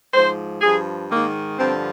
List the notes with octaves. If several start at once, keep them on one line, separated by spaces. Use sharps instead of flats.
G#2 F3 C5
G2 F3 G#4
G#2 D#3 A#3
G2 D3 F3 C4